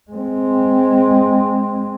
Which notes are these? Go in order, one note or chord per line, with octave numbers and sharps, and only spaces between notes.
G#3 C4